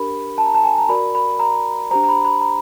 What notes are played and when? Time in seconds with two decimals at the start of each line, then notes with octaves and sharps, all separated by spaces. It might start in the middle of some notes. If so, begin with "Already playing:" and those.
Already playing: D4 G4 A#4 B5
0.38 A5
0.46 A#5
0.54 A5
0.63 G#5
0.78 A#5
0.89 F#4 A#4 D5 B5
1.15 B5
1.39 A#5
1.91 D4 G4 C5 A#5
2.04 A#5
2.09 B5
2.24 B5
2.41 A#5